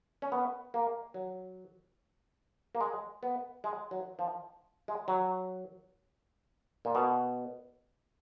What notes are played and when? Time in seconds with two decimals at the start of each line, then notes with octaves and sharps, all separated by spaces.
0.22 C#4
0.32 B3
0.74 A#3
1.14 F#3
2.75 A#3
2.81 G#3
3.23 B3
3.64 G#3
3.91 F#3
4.19 F3
4.88 G#3
5.08 F#3
6.85 A#2
6.95 B2